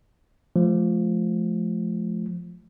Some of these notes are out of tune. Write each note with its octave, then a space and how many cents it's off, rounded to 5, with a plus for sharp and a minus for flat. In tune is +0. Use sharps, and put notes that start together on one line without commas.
F3 +0 A3 -35